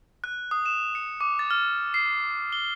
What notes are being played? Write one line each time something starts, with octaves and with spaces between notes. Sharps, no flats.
F#6
D#6
E7
C#7
D6
A6
F6
C7
G7